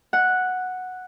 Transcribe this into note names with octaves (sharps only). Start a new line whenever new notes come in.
F#5